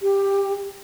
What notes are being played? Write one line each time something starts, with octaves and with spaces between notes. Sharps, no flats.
G4